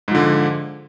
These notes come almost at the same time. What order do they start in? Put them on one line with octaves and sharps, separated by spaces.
G#2 F3 D3